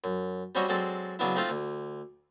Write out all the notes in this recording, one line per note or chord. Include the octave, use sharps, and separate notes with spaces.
F#2
G3 C4 C#4 F#4 C#5 D#5
F#3 G#3 C4 A4 D5
C#3 F#3 B3 D4 E4
A3 C4 D#4 F4
D2